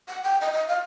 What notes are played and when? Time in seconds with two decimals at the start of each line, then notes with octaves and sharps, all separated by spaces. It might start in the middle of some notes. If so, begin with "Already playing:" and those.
0.08 F#5
0.23 G5
0.41 D#5
0.53 D#5
0.68 F5